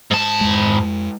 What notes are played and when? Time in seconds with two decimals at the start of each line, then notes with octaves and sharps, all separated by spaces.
0.11 G#2 A5
0.41 F2 G#3